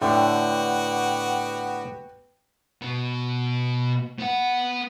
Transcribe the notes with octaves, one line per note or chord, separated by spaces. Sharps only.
A2 D3 B3 F#4 G4 G5
B2 B3
B3 F#5